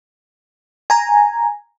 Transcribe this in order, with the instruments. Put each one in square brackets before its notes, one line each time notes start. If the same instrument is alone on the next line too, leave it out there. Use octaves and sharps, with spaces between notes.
[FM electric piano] G#5 A#5